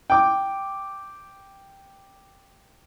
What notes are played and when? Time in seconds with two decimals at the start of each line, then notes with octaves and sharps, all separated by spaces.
0.10 G5 D6